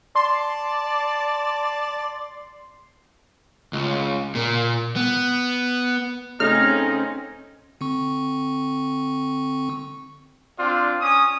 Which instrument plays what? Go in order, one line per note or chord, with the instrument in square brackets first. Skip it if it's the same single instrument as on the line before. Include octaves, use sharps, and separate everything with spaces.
[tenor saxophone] D5 [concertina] A5 [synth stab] C6
[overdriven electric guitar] C#2
A#2
B3
[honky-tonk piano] C#3 A3 [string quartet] C4 C#4 [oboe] D#4 [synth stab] F6
[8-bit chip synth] D3 C4 C#6
[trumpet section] C4 D4 F4 D5
C#4 G#5 D#6